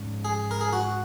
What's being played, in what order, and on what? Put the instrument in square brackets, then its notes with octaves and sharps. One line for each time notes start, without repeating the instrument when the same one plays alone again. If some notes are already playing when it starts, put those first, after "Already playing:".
Already playing: [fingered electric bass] G#2 G#3 C#4
[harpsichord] G#4
A#4
G#4
F#4